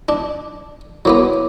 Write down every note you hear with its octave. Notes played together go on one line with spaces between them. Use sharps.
D4
F#3 A#3 B3 E4 C#5 D6